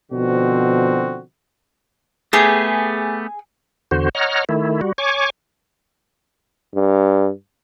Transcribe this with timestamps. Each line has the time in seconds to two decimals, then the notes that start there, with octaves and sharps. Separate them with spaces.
0.12 B2 D3 F3 C4 F#4
2.33 A3 B3 G4 G#4
3.91 E2 D3 F#4 C5
4.15 C#5 D#5 F#5 A#5 F6
4.49 D#3 A3 E4
4.81 G3 F#4
4.98 C#5 G#5 C#6 D6
6.74 G2